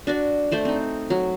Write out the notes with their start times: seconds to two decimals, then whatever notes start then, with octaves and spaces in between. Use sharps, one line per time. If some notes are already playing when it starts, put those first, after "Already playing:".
0.07 D4 F#4 D5
0.52 A3 C5 D5
0.65 C4 D#4
1.10 F#3